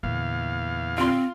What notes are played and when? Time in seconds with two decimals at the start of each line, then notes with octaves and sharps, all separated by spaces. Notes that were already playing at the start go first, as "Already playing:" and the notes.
0.03 E2 A#2 D3 F5
0.98 C4 F4 C6